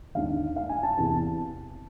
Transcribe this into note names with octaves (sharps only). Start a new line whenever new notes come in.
D#2 D3 F5
F5
G#5
A5
E2 C3 E3 A5